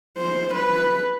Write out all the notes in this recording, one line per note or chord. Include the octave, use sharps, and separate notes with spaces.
C5
B4